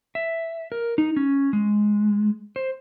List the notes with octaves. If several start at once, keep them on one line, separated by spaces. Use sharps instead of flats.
E5
A#4
D#4
C#4
G#3
C5